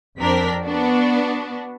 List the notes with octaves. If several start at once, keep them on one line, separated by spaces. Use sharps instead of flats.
F2 C4 D4 A#4 B6
B3 D4 F#4